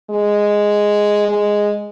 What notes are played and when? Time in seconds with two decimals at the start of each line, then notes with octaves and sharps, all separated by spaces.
0.10 G#3
1.28 G#3